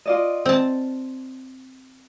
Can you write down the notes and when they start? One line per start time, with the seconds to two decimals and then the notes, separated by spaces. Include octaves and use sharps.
0.06 F4 D5 D#5
0.46 C4 A5